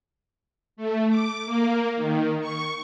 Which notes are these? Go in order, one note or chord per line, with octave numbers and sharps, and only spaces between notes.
A3
D6
A#3
D#3
C#6